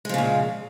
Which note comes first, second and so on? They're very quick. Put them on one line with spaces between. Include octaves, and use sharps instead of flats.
G#3 F3 C#3 A#2